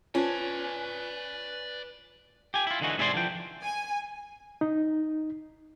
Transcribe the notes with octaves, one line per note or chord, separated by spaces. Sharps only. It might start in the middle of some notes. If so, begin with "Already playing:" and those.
C#4 F4 B4 C5 D5 G#5 A5
G4 G#5
E4 F4
D3 E3 G#3 D#4 F#4
G#2 C3 E4 G#4 D5 C6
C2 D3 E3 F3 G5
G#5
D#4